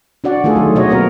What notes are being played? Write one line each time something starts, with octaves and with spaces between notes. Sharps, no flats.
D4 F#4 D5 F#5
D#3 A3 F4 G#4 A4
D#3 F#3
B2 F#4 C#5 D#5
A#3 B3 F#4 A#4